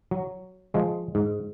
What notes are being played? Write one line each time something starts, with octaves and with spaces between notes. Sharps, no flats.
F#3
F3 G#3
G#2